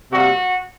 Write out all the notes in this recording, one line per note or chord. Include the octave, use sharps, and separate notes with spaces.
C3 G3 A#3 F#4